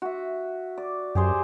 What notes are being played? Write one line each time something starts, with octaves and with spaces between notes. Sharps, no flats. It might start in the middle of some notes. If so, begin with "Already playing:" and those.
F#4 E5
D5
F#2 G4 G#4 C5